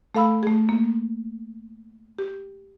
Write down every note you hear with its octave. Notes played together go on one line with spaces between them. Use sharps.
A3 A4 F5 B5 E6
A3 G#4
A#3
G4